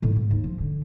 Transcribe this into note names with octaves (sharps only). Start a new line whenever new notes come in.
A2 D#3
G#2
D#2
F3
D3